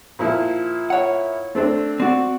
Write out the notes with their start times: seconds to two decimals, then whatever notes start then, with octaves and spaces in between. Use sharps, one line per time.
0.19 A#2 F3 E4
0.90 C#5 F#5
1.55 A3 C4 D4
2.00 C4 F#4 D5